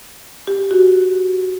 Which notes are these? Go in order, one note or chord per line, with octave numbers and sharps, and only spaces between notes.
G4
F#4